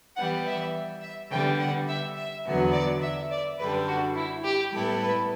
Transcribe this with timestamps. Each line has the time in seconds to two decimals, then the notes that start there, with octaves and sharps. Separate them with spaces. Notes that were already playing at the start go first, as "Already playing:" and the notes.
0.16 E3 G3 B3 F#5
0.45 E5
1.02 E5
1.31 D3 G3 B3 G5
1.59 F#5
1.88 E5
2.17 E5
2.45 E2 D3 F#3 B3 F#4
2.73 D5
3.01 E5
3.31 D5
3.59 F#2 D3 G3 D4 B4
3.87 F#4
4.16 E4
4.45 G4
4.72 A2 G3 B3 E4 A4
5.01 B4